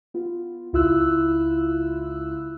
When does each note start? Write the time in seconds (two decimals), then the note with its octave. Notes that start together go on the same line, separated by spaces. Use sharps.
0.14 B3 F4
0.73 C#2 E4 F4 E6 F#6